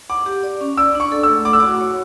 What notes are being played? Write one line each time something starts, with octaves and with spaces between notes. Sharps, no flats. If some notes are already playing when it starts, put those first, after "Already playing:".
F#5 D6
G4
D5
C#4
D5 E6
D4 C#6
A4
E6
A3
F#5 D6
E6
F#4 D6
C#5